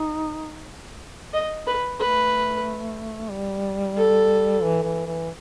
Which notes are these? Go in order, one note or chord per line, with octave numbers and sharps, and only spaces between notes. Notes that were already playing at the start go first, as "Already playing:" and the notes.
Already playing: D#4
D#5
B4
A3 B4
G3
A4
E3
E3
E3